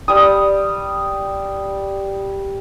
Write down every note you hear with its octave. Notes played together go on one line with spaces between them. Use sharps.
G3 D#6